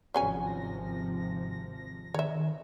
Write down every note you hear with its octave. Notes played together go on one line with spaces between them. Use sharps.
G#1 C3 F3 F#3 C#4 G#5
A#6
D#3 C#5 E5